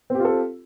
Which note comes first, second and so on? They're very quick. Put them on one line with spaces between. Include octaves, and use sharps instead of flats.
C4 G4 F4 A4